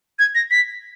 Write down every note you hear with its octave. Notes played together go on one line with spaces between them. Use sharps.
G#6
A#6
B6